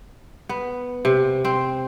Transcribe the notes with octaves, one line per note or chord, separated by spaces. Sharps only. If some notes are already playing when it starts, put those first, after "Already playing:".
B3
C3
C4